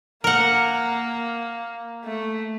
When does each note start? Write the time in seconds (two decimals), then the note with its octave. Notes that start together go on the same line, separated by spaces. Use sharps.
0.24 A#3 A#4 F#5
2.04 A3